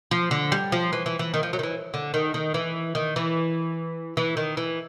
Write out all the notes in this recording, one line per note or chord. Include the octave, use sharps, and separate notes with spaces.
F3
D3
G3
F3
E3
E3
E3
D#3
F3
F#3
D#3
E3
D3
D#3
D#3
E3
D#3
E3
E3
D#3
E3